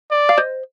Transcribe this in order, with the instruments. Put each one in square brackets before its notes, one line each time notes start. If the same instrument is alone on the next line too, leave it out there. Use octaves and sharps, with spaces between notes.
[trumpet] D5
[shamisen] F5
C5 D#5